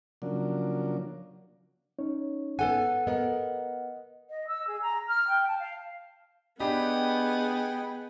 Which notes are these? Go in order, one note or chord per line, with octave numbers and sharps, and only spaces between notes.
C#3 F3 F#3 A#3 D4
C#4 D#4 C#5
B3 A4 F#5 G#5
B3 A#4 D#5
D#5
E6
G#4
A#5
F6
G5
A5
F5
B3 D4 G4 G#4 D#5 G5 G#5 B5